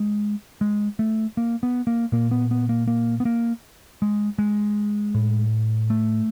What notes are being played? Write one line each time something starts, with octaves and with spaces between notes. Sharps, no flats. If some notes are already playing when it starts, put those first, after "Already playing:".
Already playing: G#3
G#3
A3
A#3
B3
A#3
A#2 A#3
B3
B3
A#3
A#3
B3
A#3
G#3
G#3
A2
A3